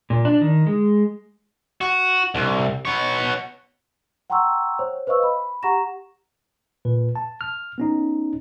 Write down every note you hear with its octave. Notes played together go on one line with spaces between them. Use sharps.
A#2
D4
D#3
G#3
F#4
C2
B3 C#5
F#5 G5 A#5 C6 C#6 E6
C5 C#5
B4 C5 D#5 F5 C#6 E6
B5
G4 F#5 A#5 C#6 A#6 E7
A#2 B4
A5
F6
B3 C#4 D#4